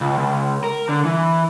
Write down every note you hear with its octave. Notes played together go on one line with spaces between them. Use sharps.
C#2
C#2
A#4
D3
E3